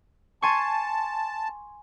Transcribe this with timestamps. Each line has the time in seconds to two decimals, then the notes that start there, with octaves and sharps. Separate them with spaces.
0.42 G#5 A5 C6 C#6